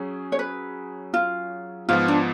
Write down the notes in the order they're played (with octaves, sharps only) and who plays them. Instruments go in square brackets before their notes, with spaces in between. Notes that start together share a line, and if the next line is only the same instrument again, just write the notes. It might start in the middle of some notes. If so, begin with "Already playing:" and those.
Already playing: [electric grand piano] F#3 C#4 G#4
[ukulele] C#5
B4
F4
[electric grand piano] G#2 F3 B3 [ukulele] F4
[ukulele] D4